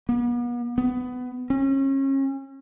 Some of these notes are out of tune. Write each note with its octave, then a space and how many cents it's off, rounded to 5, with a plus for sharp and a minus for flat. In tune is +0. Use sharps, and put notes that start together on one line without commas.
B3 -40
B3 +20
C#4 -30